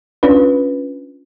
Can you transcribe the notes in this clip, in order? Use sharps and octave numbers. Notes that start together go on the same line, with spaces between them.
C#4 D4 F4 B4